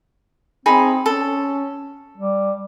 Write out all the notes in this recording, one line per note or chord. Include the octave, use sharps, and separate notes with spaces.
C4 D#4 G#4 B5
C#4 A4
G3